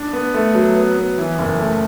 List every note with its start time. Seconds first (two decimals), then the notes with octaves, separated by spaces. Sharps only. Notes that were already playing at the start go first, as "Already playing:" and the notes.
Already playing: D4
0.13 B3
0.34 A3
0.55 F#3
0.76 B3
0.97 B3
1.18 E3
1.39 F#1
1.59 A3